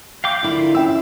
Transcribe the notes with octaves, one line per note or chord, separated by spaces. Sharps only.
F5 G5 D6
D3 E4 F4 A#4
C#4 E5 G5 E6